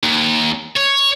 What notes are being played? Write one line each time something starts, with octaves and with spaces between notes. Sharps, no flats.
D#2
C#5